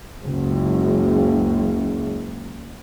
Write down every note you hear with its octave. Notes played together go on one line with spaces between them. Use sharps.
F#1 C#2